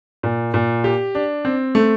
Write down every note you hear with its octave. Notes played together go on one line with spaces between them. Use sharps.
A#2
A#2
G4
D4
C4
A3